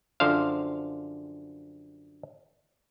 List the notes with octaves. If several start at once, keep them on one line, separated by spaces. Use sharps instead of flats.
F#2 D3 F3 C5 F5